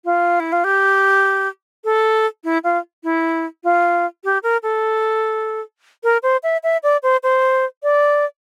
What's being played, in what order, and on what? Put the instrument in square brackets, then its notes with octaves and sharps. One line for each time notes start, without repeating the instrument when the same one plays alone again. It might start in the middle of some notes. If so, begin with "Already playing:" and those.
[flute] F4
E4
F4
G4
A4
E4
F4
E4
F4
G4
A#4
A4
A#4
C5
E5
E5
D5
C5
C5
D5